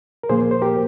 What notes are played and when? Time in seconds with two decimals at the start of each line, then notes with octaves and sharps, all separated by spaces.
0.23 A#4
0.29 A#2 F3 A#3 G#4 C5
0.51 C5
0.62 G4 A#4